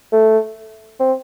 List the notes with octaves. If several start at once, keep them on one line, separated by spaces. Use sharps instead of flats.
A3
C4